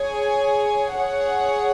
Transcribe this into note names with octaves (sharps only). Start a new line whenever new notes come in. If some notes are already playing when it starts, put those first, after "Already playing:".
Already playing: G#4 C#5 G#5
G#4 C#5 F#5